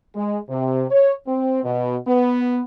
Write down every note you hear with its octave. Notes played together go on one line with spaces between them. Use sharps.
G#3
C3
C#5
C4
B2
B3